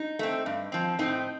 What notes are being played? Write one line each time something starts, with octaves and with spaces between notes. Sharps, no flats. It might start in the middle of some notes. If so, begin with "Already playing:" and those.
Already playing: D#4
A3 C4
G2
F3 C4
A2 C4 D#4